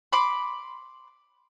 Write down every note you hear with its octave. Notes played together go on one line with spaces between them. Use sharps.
B5 C6 D6